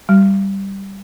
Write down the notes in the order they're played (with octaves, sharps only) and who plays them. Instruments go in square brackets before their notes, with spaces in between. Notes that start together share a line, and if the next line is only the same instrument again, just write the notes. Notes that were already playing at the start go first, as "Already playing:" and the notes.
[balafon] G3